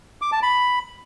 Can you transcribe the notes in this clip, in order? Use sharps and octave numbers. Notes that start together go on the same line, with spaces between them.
D6
A5
B5